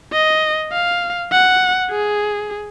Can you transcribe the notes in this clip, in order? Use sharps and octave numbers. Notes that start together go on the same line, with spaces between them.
D#5
F5
F#5
G#4